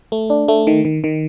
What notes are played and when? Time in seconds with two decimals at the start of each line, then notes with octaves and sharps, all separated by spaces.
0.12 A3
0.30 D4
0.48 A3
0.67 D#3
0.85 D#3
1.04 D#3